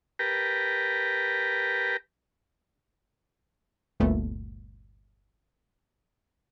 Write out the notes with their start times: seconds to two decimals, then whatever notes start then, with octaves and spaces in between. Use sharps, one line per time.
0.19 G4 A#4 B4 G5 A5 A#5
4.00 G1 D2 A#2 A3 B3